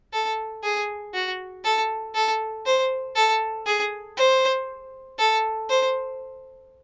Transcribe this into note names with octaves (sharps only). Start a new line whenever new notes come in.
A4
G#4
F#4
A4
A4
C5
A4
G#4
C5
A4
C5